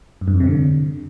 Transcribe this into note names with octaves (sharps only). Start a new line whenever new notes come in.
F#2
G2
F2
C3
D3